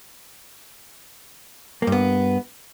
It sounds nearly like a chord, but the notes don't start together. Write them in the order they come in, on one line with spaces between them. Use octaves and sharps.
A#3 G2 B3